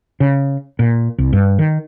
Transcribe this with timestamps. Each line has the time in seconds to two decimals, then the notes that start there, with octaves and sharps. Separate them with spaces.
0.20 C#3
0.79 A#2
1.18 C2
1.33 G2
1.59 D#3